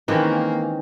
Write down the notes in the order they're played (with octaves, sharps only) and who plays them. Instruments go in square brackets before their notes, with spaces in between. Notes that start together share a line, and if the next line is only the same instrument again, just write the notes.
[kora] D#3 E3 G#3 [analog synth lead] A#3 [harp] C4 C#4